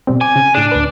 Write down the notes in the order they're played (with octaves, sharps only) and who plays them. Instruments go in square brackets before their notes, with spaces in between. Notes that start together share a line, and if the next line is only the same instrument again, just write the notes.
[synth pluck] B2 G3 C4
[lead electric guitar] G#5 [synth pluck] D6
[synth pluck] C#3
[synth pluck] A2 G#4 [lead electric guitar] D4
[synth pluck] D2 B4